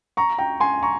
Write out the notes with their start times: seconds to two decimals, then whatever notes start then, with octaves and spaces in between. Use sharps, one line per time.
0.17 A#5 C#6
0.38 G5 A#5
0.60 G#5 C6
0.83 A#5 C#6